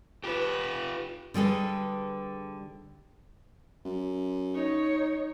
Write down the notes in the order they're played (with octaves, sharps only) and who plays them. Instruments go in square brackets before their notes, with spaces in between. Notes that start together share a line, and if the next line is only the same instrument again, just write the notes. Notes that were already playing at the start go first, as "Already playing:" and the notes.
[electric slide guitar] F4 G4 [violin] B4
[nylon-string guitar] D3 G3 G#4 A4 B4
[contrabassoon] F#2
[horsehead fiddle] D#4 C#5